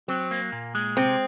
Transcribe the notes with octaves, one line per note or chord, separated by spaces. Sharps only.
F#3 C4
A#3
A#2
G#3
C3 C4